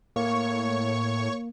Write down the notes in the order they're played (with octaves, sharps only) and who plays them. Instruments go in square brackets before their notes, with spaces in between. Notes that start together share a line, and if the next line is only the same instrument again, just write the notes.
[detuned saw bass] A2 [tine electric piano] A#3 [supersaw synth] C#5 C#6